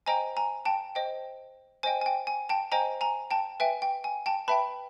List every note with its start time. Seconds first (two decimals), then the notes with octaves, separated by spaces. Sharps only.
0.06 C5 D#5 G5 G#5 A#5
0.37 G#5 A#5
0.65 G5 A5
0.95 C5 D#5 G5
1.83 C5 D#5 G5 G#5
2.01 G#5
2.06 G5
2.27 G#5
2.49 G5 A5
2.72 C5 D#5 G5 G#5 A#5
3.01 G#5 A#5
3.31 G5 A5
3.60 B4 E5 G5 G#5
3.82 G5
4.04 G#5
4.26 G5 A5
4.48 B4 E5 G5 A5 B5